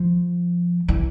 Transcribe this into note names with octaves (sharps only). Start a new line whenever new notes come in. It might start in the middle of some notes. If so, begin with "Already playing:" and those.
Already playing: F3
E3